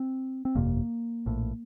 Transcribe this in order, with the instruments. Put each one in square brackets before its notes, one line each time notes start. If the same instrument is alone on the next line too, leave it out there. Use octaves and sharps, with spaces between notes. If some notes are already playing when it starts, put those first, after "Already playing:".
Already playing: [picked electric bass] C4
C4
G1 F2 C3 A#3
A#1 A2